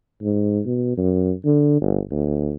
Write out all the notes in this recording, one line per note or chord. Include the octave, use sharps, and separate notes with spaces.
G#2
B2
F#2
D3
G1
D2